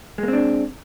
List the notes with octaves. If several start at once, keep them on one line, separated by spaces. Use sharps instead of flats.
G#3 A#3 C4 D4